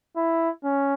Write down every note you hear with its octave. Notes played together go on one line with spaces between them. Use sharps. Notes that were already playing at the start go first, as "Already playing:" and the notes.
E4
C#4